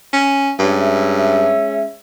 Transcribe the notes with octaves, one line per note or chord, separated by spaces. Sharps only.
C#4
G2 G#3 C#4 E5